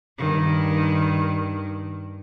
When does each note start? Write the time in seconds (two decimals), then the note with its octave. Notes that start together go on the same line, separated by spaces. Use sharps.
0.18 G2 D#3